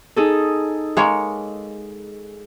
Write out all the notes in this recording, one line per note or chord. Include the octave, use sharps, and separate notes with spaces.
D#4 G#4 A4
G#3 A#3 C#5